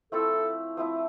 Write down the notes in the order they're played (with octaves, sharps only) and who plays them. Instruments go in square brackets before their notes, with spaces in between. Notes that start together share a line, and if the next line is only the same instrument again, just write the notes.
[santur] F3 A3 C4 E4 [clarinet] A4
[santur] F3 A3 C4 E4